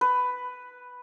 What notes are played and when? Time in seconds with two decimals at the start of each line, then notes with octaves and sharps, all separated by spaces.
0.01 B4